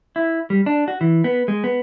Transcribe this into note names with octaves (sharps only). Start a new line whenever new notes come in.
E4
G3
D4
F#4
E3
B3
G#3
B3